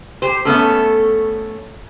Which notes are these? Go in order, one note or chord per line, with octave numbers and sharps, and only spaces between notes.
G4 C5
A3 B3 C#4 A4